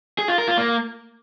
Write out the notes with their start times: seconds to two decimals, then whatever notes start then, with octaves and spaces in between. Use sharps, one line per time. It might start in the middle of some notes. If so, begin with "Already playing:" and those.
0.18 G#4
0.28 F4
0.38 A#4
0.48 F4
0.58 A#3